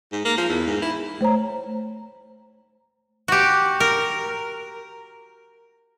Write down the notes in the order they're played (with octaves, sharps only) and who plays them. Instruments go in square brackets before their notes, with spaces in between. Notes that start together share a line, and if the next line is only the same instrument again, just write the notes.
[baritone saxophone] G#2
A#3
F3
E2
G#2
E4
[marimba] A3 C5 C#5 A#5
[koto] F#4 G4
A#4